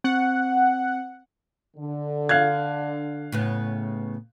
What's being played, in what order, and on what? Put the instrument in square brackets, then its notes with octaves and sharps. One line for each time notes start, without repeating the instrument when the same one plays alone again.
[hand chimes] C4 [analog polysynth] F#5
[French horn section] D3
[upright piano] F5 F#6 G#6
[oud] A2 C#3 B3